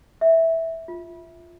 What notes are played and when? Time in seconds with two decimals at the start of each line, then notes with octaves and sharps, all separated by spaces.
0.21 E5
0.88 F4